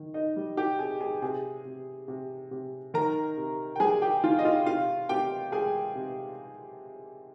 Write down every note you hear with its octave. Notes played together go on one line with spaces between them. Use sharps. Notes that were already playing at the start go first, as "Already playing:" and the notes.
Already playing: D#3
D#4 D#5
G3
G4 G5
C3 G#4 G#5
G#4 G#5
C3 G#4 G#5
C3
C3
C3
D#3 A#4 A#5
C3
G5
G3 G#4 G#5
G4 G5
D#3 F4 F5
D#5
F4 F5
C3 F4 F5
C3 G4 G5
G#3 G#4 G#5
C3